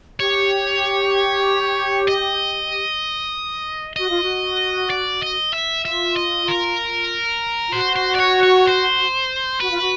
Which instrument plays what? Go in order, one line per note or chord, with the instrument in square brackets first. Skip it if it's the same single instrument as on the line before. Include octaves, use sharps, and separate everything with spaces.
[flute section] G4 [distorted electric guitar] C#5
[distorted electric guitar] D#5
[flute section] F#4 [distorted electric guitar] D#5
[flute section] F4
F#4
[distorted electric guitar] D5
D#5
E5
[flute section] F4 [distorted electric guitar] E5
[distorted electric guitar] D#5
A#4
[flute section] F4
[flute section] F#4 [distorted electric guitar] C5
[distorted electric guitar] C5
D5
C#5
C#5
C5
[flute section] F#4 [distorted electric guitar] B4
[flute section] F4
F#4